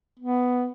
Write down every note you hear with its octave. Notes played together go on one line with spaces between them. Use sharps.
B3